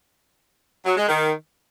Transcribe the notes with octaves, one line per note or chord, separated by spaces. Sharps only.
F#3
G#3
D#3